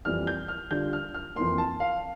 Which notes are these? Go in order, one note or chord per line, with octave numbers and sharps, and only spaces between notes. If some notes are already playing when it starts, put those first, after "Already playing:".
F2 E3 G3 F6
G6
F6
D3 G3 D4 F4 G6
F6
F6
F2 E3 A#3 C6
A5
F5